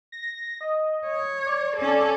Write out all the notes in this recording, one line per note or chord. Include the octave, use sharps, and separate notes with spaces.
A#6
D#5
C#5
D5
C#4 A4